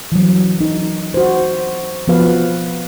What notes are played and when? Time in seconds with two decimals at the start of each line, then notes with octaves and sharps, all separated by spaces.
0.12 E3 F#3
0.61 D#4
1.14 F#4 C5
2.08 F3 B3 F#4 B4 F5